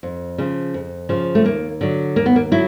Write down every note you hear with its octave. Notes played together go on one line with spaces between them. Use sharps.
F2
C#3 F3
F2
C#3 F3
A3
D#2 A#3
D3 F#3
D#2 A#3
B3
A#3
D3 F#3 E4